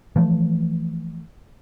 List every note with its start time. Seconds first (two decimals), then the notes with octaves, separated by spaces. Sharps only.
0.16 E3 F3 A3